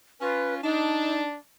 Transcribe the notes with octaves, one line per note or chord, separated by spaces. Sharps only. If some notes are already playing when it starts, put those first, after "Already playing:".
C#4 F4 B4
D4 D#4